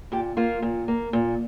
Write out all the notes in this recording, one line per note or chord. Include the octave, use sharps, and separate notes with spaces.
A#2 G4
A#3 F4
A#2
A#3
A#2